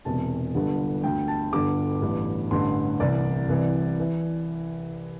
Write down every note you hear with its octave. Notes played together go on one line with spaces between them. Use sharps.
E1 E2 C3 A5
G1 G2 D3
D2 D3 G5
A5
G1 G2 D3 D6
A1 G2 E3
A1 G2 D3 C6
C2 C3 E3 D5
C2 C3 E3
E3